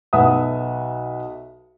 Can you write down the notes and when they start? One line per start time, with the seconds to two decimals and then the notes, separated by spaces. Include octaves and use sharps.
0.13 B1 B4 E5 F#5 A5 D#6